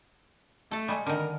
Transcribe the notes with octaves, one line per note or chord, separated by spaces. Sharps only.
A3 A4 A5
G3 G#3
D3 D#3 A#4